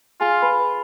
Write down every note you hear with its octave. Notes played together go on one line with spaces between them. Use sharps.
F4 G#4 G#5
B4 B5